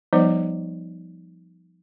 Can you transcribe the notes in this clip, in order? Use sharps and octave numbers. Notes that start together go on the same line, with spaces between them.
F3 G3 B3 D#4 C5 D5